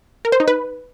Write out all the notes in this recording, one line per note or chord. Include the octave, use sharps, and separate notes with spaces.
A#4
C5
D#4
B4